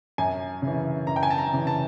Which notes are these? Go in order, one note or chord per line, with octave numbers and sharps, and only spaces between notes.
F#2 G#5
C#3
E3
F#2 A#5
G5
G#5
A5
A#5
C#3 E3
A5